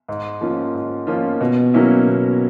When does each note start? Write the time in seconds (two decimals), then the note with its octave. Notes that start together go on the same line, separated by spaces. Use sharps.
0.09 G#2
0.41 F3 A#3 C#4 F4
0.74 G#2
1.07 F3 A#3 C#4 F4
1.41 B2
1.74 F#3 A#3 C#4 E4
2.07 B2